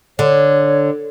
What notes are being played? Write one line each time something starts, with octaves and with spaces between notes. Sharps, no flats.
D3 C#5